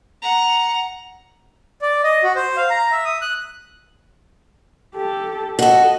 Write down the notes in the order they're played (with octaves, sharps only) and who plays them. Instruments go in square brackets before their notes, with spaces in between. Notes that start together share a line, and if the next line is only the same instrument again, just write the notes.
[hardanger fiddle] F#5 A#5
[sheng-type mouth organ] D5
D#5
F#4
C5
F5
A#5
E5
D#6
F#6
[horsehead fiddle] G4 A4
[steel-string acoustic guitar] F#4 A4 [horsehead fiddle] D#5